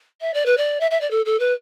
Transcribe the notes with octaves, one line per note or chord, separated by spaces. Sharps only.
E5
D5
B4
D5
E5
E5
D5
A4
A4
B4